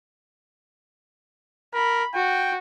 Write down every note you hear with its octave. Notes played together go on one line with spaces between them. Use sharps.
A#4 B5
F#4 G5